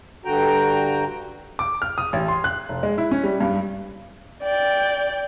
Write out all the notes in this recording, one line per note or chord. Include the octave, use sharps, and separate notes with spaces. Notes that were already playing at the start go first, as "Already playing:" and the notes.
G2 D3 F#4 G5 A#5
D6
F6
D#6
A1
C6
F#6
F1
G#3
E4
C#4
G3
G2
D5 G5